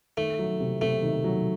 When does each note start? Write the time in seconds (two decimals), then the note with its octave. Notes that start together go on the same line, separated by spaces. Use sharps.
0.17 D#3 A3
0.39 F#3
0.60 C3
0.81 C3 A3
1.03 D#3
1.24 F#3